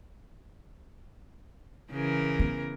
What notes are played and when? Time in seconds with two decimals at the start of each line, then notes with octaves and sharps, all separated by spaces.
1.91 C#3 E3 A#4
2.39 B3